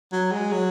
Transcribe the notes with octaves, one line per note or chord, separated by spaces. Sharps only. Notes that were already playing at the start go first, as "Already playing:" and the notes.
F#3
G#3
F#3